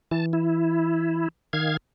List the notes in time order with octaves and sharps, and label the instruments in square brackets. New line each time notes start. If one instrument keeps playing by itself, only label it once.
[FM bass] E3 [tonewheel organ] A5
[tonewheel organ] E4
D#3 F5 G#6